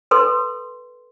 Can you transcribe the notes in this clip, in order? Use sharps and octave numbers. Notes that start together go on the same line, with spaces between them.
A4 B4 C6